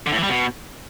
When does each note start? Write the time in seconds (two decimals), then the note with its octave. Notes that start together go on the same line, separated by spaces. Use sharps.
0.06 D3
0.12 A2
0.18 E3
0.23 G3
0.29 B2